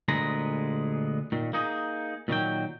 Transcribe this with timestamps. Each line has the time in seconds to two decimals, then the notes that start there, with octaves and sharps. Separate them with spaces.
0.08 D2 A#2 G#3 B3 G#4 A#5
1.32 A#2 D#3
1.53 A#3 D#4 G#4
2.28 A#2 D#3 F#3 G5